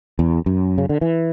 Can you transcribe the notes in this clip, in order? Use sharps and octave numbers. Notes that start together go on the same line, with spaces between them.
E2
F#2
C#3
D3
E3